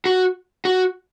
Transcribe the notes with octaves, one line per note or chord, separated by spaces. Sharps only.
F#4
F#4